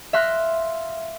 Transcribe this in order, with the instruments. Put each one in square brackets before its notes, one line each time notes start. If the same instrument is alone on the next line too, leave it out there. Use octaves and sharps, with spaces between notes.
[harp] E5 F5 C6 F#6 A#6